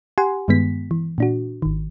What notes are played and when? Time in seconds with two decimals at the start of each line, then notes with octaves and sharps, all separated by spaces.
0.18 G4 F#5 G#5 C6
0.48 G2 D#3 G#3 B3 B6
0.91 E3
1.18 A#2 D4 F#4
1.62 G#1 D#3